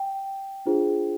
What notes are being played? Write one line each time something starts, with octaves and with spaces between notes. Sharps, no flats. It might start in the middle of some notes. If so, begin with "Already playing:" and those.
Already playing: G5
D4 F4 G#4 C5